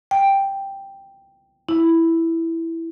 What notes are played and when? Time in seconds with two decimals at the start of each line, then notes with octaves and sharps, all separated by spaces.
0.11 G5
1.69 E4